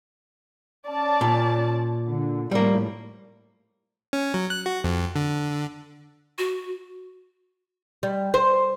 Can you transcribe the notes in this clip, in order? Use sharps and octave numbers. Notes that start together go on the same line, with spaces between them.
C#4 D5 A5
A#2
D3
A2 F3 G3 A#3
C#4
F#3
F#6
F#4
F2
D3
F#4
G3
C5